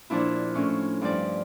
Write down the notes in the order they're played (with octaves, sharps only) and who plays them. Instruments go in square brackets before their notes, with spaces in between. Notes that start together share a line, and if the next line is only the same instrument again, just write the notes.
[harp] A#2 F3 D4 E4
A2 C#4
G2 F3 G3 D5